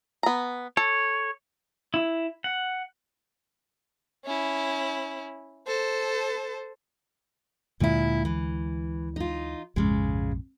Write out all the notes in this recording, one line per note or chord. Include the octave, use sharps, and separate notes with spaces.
B3 A#5
A4 C#5
E4
F#5
C#4 E4
A4 C5
D2 A#2 D3 G#3 E4
E3
D#4 F4
A#1 F2 G#2 C#3 G#3